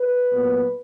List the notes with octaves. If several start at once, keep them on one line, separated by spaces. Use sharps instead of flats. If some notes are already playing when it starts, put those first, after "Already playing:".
Already playing: B4
A#2 F#3 B3